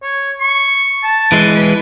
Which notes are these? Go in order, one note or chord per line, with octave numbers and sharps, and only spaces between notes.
C#5
C#6
A5
E3 G#3
B4